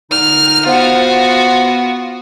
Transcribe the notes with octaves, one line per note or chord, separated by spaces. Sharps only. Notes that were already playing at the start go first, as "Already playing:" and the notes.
A#2 D3 D#4 F6
B3 F4 F#4 C5 F#5